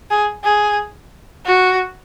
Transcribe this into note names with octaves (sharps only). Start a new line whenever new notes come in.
G#4
G#4
F#4